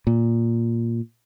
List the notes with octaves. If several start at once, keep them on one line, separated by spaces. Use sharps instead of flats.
A#2